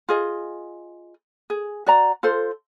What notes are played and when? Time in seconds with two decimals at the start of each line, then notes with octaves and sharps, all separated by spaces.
0.09 F4 G#4 D#5
1.50 G#4
1.86 F#4 D5 A#5
2.23 F4 A4 C5